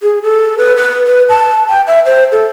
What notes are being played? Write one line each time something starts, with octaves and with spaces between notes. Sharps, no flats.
G#4
A4
B4
B4
B4
A5
G5
E5
C5
A4